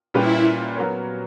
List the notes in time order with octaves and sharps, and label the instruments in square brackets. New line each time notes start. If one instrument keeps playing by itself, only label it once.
[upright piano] A#2 G3 C#4 G4 B4 [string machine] E4
[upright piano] F#3 B3 F#4 A#4 C#5